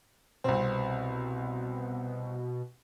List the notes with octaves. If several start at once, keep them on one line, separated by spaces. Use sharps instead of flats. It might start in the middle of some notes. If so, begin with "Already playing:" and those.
C2 B2 C4